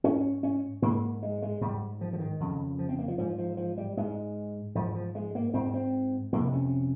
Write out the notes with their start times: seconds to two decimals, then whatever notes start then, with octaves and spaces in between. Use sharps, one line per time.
0.04 G#2 C#4
0.43 C#4
0.82 G#2 A#3
1.23 G#3
1.42 G#3
1.61 G#2 G3
2.01 F3
2.13 F3
2.20 D#3
2.40 F2 C#3
2.79 F3
2.89 C4
2.99 A#3
3.08 F3
3.18 G#2 F3
3.38 F3
3.57 F3
3.78 G3
3.97 G#2 G#3
4.75 G#2 F3
4.95 F3
5.15 G#3
5.35 A#3
5.54 G#2 C4
5.74 C4
6.32 F2 C3 A#3
6.53 C#4